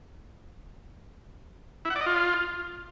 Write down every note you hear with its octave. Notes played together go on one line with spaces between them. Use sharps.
E4
F#5
D5
D#5
F4